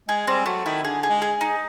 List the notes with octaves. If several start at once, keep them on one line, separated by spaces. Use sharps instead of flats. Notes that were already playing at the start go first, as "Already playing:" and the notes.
G#3 G#4
G3 C4
F#3 A3
D#3 E4
D3 G#4
G#4
G#3
G#4
D#4